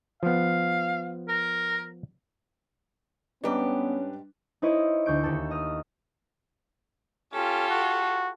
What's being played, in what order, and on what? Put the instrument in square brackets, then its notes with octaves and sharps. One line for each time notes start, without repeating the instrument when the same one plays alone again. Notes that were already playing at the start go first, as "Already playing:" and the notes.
[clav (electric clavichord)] F3 B3 [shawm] F5
[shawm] A#4
[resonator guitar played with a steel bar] G#2 G4 [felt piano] G3 D4 B4 [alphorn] B3 [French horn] C#4
[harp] D#4 E4 C5 C#5 D#5
D2 C#6 G6 D7
D#2 A4
D#5 D#6 F6
[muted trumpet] C#4 [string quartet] F4 G4 A4
[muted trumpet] F#4